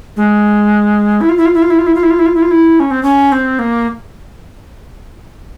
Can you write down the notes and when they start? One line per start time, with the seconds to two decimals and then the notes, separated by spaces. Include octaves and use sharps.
0.17 G#3
1.21 E4
1.29 F4
1.37 E4
1.46 F4
1.54 E4
1.62 F4
1.70 E4
1.79 F4
1.87 E4
1.95 F4
2.03 E4
2.10 F4
2.19 E4
2.26 F4
2.35 E4
2.42 F4
2.51 E4
2.80 C#4
2.91 C4
3.03 C#4
3.32 C4
3.59 A#3